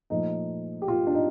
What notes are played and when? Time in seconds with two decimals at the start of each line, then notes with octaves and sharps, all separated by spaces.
0.10 A#2 F3 A3 D#4
0.82 G4
0.88 F4
1.07 D4
1.14 D#4